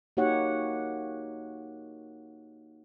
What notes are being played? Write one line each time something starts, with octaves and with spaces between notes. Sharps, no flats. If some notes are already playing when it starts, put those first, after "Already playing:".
A#3 D#4 F#4 G4 C#5 F#5